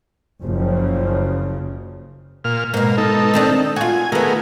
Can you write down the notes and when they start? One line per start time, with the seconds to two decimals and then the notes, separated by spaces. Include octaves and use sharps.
0.43 F#1 C#3 F3
2.44 A#2 F6
2.74 G#2 B2 A#3
2.98 D#4 A4
3.34 D#3 C4 D4
3.76 F4 F#4 G#5
4.12 D#3 A3 B3 G#4 A#4